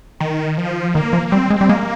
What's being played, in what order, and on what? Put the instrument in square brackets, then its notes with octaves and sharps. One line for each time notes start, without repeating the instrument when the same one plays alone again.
[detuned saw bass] D#3
F3
[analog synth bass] D#3 [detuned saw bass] A#3
[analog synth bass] F3
[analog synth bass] G3 [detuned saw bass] C4
[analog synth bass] G#3
G3
[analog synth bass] G#3 [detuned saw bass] A#3